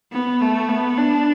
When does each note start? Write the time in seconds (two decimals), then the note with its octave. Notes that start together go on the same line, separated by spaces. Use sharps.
0.12 B3
0.41 A3
0.68 B3
0.97 D4